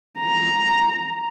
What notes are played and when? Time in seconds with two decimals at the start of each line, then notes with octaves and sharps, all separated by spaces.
0.20 A#5